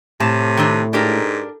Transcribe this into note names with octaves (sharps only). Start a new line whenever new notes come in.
A2 C3 A5
D#3 C4 D4
G#2 D4 G4 A#4